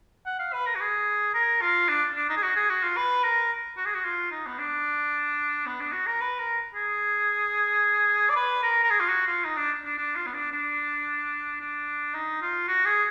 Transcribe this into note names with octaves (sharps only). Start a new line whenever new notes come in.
F#5
F5
B4
A#4
F#4
G#4
A#4
F4
D4
D4
D#4
G#4
F#4
G#4
F#4
F4
B4
A#4
F#4
G#4
F#4
F4
D#4
B3
D4
B3
D4
F#4
A#4
B4
A#4
G#4
D5
B4
A#4
A#4
G#4
F4
F#4
F4
D#4
D4
D4
D4
F4
B3
D4
D4
D4
D#4
F4
F#4
G#4